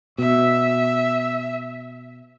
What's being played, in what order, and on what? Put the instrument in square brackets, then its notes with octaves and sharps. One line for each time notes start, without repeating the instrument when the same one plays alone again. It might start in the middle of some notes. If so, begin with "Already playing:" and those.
[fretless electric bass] B2 [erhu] E5